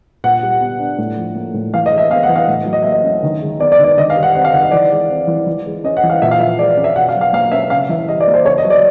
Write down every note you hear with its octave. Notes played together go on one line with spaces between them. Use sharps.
A#2 F#5
G3
B3
D4
A2
F3
A#3
A2
E3 F5
D#5
G#3
E5
B3 F5
F#5
E3
F5
A2
F#3
D#5
A#3 E5
D#5
C#4
D#3
G#3
B3 D5
D5
D#3
D5
D#3 D#5
F5
G3
F#5
C4 F#5
F5
D#3 F#5
D#5
E3 D5
G#3
C4
E3
E3
G#3
C#4 D#5
F#5
E3
F5
A#2 E5
F5
F3 E5
G#3 D5
C#4
E5
B2 F#5
F5
F#3
F5
A#3 F5
C#4 E5
C#3 F5
E3 E5
G3 D#5
D5
A#3
C5
C#3 C#5
D#5
F#3
D5